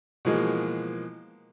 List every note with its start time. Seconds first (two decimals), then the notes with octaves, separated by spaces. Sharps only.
0.25 B2 E3 F3 G#3 A#3 G#4